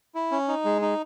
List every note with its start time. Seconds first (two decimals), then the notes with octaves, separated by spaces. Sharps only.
0.15 E4
0.32 C#4
0.48 D#4
0.65 G#3
0.82 D#4